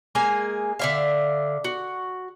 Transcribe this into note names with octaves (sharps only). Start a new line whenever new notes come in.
G#3 A#3 G#4 G#5
D3 E5 F5
F#4